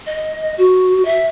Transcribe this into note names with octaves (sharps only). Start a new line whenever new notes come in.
D#5
F#4
E5